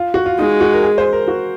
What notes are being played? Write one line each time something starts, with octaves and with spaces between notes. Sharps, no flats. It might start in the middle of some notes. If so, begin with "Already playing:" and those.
Already playing: F4
F#4
F4
G#3 D#4
F#4
A#4
G#4
C5
A#4
F#4